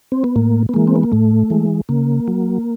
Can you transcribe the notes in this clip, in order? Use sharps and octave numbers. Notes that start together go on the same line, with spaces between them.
C4
B3
A2 A#3
B3
E3 G#3 A#3
C4
B3
A#3
A2 A3
E3 G#3
C#3 A#3
F#3